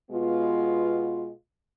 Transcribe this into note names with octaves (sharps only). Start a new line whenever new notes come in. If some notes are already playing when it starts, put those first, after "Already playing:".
B2 G#3 B3 F4